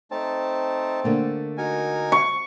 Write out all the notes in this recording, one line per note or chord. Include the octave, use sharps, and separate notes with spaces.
A3 C4 D#4 A5
D3 A3 A#3
D#4 F#4 A#4 G#5
C#6